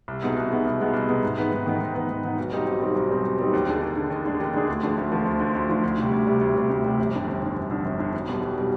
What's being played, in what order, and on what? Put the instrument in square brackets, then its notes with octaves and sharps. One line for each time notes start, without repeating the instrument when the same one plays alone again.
[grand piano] C2
B2 G#3 B3 D#4
C2
B2 G#3 B3 D#4
C2
B2 G#3 B3 D#4
C2
B2 G#3 B3 D#4
G#2
D#3 B3 D#4 B4
G#2
D#3 B3 D#4 B4
G#2
D#3 B3 D#4 B4
G#2
D#3 B3 D#4 B4
B1
B2 G3 C4 D#4
B1
B2 G3 C4 D#4
B1
B2 G3 C4 D#4
B1
B2 G3 C4 D#4
D#2
D3 G#3 D4 G#4
D#2
D3 G#3 D4 G#4
D#2
D3 G#3 D4 G#4
D#2
D3 G#3 D4 G#4
D2
D3 F3
D2
D3 F3
D2
D3 F3
D2
D3 F3
D2
C3 G3
D2
C3 G3
D2
C3 G3
D2
C3 G3
G1
F2 D3
G1
F2 D3
G1
F2 D3
G1
F2 D3
B1
B2 G3
B1
B2 G3